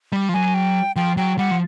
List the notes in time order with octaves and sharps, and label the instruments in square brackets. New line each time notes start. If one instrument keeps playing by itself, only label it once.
[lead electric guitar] G3
F3
[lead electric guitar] F#3 [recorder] G#5
[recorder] G5
[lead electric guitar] F3 [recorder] G5
[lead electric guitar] F#3 [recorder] G5
[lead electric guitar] G3 [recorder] F#5
[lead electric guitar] F3